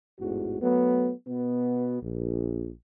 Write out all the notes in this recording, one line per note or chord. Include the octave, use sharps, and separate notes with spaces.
A1 E2 G#2 F#4
F#3 A3 B3
B2 B3
A#1